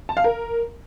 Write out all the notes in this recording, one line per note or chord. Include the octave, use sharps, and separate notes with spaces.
A5
F5
A#4